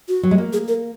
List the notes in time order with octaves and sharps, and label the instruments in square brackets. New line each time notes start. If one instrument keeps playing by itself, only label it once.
[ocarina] F#4
[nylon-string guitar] F#3
G#3
A#3
[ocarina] G#4
A#4